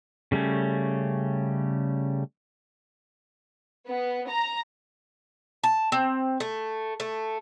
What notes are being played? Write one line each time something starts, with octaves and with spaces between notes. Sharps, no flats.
C#3 G3 A3 C#4
B3
A#5
A5
C4
A3
A3